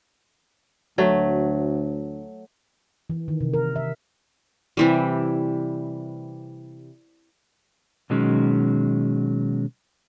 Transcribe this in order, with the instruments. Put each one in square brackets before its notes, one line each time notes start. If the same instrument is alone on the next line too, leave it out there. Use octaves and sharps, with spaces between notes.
[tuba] D2 [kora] F#3 A3
[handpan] E3
D#3
C3
A#4
E5
[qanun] C3 E3 G3
[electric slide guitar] B2 D#3 F#3 G#3 C#4